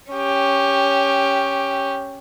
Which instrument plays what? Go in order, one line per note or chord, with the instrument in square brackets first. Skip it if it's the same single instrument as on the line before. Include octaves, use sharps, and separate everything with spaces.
[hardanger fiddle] C#4 G4